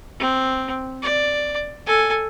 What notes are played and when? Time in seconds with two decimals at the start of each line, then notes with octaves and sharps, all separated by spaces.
0.19 C4
1.03 D5
1.86 A4 G#5